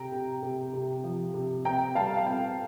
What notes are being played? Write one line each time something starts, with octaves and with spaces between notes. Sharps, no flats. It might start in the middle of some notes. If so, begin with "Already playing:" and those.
Already playing: C3 G5 A#5
C3
C3
C3
F3
C3
C4 G5 A#5
G3 F5 A5
F5
C4 G5